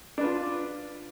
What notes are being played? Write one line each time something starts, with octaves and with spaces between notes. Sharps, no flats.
D4 F4 B4